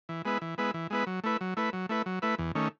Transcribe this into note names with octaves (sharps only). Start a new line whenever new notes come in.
E3
G#3 B3 E4 B4
E3
G#3 B3 E4 B4
E3
G#3 B3 E4 B4
F#3
A3 E4 B4
F#3
A3 E4 B4
F#3
A3 E4 B4
F#3
A3 E4 B4
E2
D#3 A3 C#4